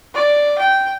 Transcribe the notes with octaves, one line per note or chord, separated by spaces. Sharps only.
D5
G5